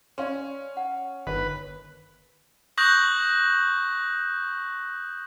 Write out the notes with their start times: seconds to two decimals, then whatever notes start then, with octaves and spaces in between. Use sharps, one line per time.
0.18 C#4 D5 F5 C6
0.77 F#5
1.27 G1 D#3 B4
2.78 C#6 D#6 F#6 G6 A#6 F#7